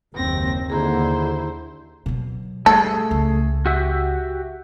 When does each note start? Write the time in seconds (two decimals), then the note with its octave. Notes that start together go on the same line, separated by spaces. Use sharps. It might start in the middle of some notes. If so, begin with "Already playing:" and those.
0.14 F#1 D#2 C4 A#6
0.70 D#2 D3 E4 G#4 C5 A#5
2.06 B2 F#3
2.66 G3 A3 G#4 A4
3.11 C#2
3.66 F#4 G4 E5